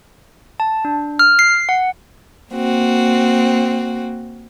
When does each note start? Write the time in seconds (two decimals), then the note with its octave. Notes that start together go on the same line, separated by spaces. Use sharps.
0.60 A5
0.85 D4
1.19 F6
1.39 C7
1.69 F#5
2.51 A#3 C4 F#4